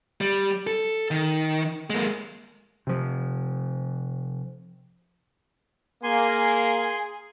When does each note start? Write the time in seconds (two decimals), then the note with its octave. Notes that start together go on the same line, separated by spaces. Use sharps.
0.21 G3
0.67 A4
1.11 D#3
1.90 G#3 A#3
2.87 C3 F3
6.03 A#3 G#4 G#5 C6